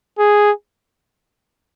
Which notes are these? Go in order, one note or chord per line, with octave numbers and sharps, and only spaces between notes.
G#4